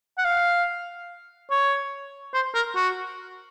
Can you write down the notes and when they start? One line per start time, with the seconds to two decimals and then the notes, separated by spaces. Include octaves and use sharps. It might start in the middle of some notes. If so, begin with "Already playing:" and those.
0.18 F#5
0.25 F5
1.50 C#5
2.34 C5
2.54 A#4
2.75 F#4